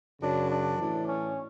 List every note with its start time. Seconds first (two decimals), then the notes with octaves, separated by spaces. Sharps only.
0.20 F#2 C#3 F#3 D4
0.49 D4
0.78 A2 E3
1.06 C#4